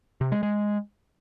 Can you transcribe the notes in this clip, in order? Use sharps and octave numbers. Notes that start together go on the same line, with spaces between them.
C3
G#3
G#3